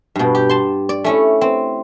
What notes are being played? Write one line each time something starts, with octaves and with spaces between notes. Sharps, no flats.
G2 B2
G4
A5 C6
D5
A3 C#4 E4
C4